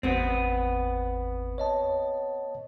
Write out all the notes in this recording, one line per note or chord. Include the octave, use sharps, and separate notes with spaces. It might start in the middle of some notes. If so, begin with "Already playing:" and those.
G#1 E2 B3 C4
C#5 D#5 A5